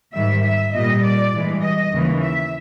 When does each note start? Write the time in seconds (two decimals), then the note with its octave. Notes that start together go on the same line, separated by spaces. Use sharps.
0.13 G#2 D#3 G3 E5
0.43 E5
0.73 A#2 G3 D#5
1.02 D5
1.32 G2 E3 G#3
1.62 D#5
1.92 D#2 C#3 E3 G#3
2.22 E5